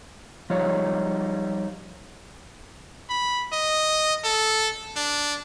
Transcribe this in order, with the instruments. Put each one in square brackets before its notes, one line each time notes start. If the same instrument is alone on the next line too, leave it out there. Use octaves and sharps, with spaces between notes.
[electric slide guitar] F3 G3 D#4 C#5
[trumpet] B5
D#5
A4
D4